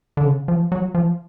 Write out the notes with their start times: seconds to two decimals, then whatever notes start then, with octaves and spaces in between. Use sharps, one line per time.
0.17 D3
0.24 C#3
0.48 F3
0.72 F#3
0.94 F3